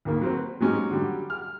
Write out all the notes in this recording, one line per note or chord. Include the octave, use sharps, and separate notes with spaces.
D2 D#3 A#3
F#3 C4
B4
F#3 G#3 C#4 D#4 G4
D3 F#3 G3
F6